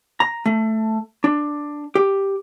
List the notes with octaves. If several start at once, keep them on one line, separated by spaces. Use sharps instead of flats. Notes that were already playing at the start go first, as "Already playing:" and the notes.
A#5
A3
D4
G4